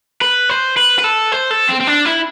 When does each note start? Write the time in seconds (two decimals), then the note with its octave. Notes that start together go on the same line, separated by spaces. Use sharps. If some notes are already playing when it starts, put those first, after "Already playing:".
0.21 B4
0.49 C5
0.77 B4
0.99 B4
1.04 A4
1.32 C5
1.51 A4
1.69 C4
1.80 C4
1.87 D4
2.05 E4